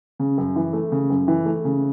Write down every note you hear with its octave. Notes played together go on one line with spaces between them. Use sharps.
C#3
F#2
E3
A3
C#3
F#2
E3
A3
C#3